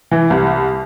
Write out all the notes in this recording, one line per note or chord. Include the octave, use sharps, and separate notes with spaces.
E3
C2